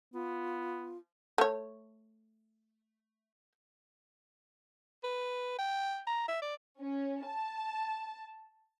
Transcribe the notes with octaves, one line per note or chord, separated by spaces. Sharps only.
B3 F4
A3 C#5
B4
G5
A#5
E5
D5
C#4
A5